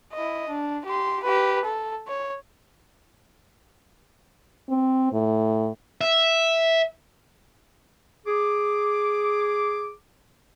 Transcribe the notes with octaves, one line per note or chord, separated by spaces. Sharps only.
E4 D#5
D4
G4 C6
G4 B4
A4
C#5
C4
A2
E5
G#4 D6